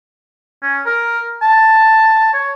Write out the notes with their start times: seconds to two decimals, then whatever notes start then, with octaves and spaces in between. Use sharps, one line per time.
0.62 C#4
0.86 A#4
1.42 A5
2.34 C#5